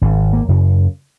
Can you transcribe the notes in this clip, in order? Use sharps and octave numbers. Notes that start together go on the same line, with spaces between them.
G#1 C#4
A#3
F#2 C#3